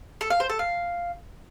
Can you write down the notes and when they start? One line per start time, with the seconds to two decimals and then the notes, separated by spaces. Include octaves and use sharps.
0.21 A4
0.30 F5
0.40 C5
0.50 A4
0.59 F5